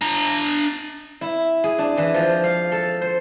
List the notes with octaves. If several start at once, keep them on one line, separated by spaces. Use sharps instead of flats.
D4 A#5
E4
G#4
D4
E3
F3
F5
A4
C5